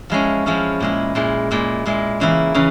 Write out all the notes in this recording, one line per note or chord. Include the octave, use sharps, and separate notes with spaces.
F3 G#3 C#4 E4
F3 G#3 C#4 E4
A#2 G#3 E4
A#2 G#3 E4
A#2 G#3 E4
A#2 G#3 E4
C#3 E3 A#3 E4
C#3 E3